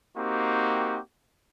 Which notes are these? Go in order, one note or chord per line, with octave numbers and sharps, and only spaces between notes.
A#3 C4 D#4 F#4 G4